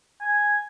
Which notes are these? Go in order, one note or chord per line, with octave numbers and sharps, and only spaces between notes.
G#5